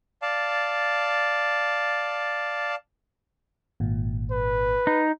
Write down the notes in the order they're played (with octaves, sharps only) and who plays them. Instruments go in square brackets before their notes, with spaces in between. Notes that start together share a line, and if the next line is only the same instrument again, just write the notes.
[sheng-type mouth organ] D5 F5 A5
[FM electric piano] G#1 A#2
[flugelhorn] B4
[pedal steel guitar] D#4